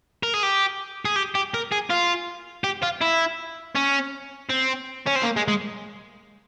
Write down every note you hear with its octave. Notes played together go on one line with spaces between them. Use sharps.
A#4
G#4
G4
G#4
G4
G4
A#4
G#4
F4
G4
F4
E4
C#4
C4
C#4
C4
A#3
G#3
G#3